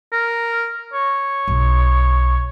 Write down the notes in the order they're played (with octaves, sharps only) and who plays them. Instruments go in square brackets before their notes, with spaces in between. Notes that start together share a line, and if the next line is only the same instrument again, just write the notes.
[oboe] A#4
C#5
[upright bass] B1